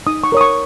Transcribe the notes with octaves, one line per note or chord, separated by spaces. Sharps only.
D#4 D#6
C#6
A#4 C#5 D#6
C#6